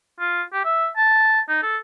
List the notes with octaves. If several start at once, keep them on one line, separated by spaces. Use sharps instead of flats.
F4
G4
E5
A5
D#4
A4